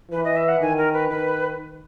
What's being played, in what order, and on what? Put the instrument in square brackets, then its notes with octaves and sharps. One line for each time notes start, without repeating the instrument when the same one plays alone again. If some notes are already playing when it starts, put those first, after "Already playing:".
[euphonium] E3 [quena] B4
[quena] D#5
E5
F#5
[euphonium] D#3 [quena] G#5
[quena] A#4
B4
[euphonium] D#3 [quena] B4